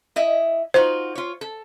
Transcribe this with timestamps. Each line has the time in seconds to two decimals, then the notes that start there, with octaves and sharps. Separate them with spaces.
0.16 E4 D#5 E5
0.74 D#4 F4 F#4 C5
1.15 F4 C#5
1.41 A4